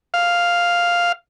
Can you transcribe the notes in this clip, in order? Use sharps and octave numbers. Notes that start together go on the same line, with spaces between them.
F5